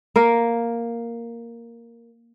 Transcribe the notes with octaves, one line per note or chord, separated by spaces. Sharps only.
A#3 A#4